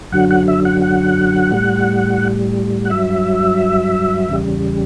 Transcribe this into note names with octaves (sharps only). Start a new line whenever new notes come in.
F#2 D3 F#3 F#5
F#5
E5
F#5
F#5
A2 G3
F#5
G2 F#3 E5
E2 C#3 G3